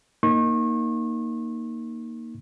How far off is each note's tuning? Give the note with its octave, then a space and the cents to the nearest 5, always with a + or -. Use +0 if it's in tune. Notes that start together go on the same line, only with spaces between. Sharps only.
A#3 +0 D#4 +0 C#6 -35